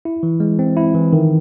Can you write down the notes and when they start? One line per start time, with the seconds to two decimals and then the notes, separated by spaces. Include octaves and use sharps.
0.05 E4
0.23 E3
0.40 G#3
0.59 C4
0.77 E4
0.94 E3
1.13 D#3